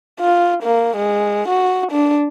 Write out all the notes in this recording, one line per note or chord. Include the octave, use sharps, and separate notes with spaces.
F4
A#3
G#3
F#4
D4